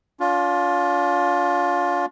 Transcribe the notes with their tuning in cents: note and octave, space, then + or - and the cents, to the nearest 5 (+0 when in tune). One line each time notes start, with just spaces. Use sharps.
D4 -40 F4 +20